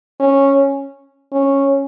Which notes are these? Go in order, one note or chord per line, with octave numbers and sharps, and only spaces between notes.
C#4
C#4